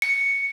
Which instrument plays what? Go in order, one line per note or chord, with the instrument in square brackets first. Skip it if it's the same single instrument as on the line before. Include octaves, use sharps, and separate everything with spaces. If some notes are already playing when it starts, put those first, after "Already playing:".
[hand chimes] C#7